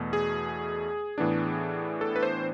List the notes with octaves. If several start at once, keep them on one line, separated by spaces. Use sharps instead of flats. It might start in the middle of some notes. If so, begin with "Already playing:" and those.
Already playing: E2 B2 A3
G#4
A2 E3 B3 D4
A4
B4
C5